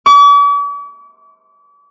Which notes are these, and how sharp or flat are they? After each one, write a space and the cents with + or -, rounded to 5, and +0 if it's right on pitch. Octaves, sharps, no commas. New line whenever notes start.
D6 -45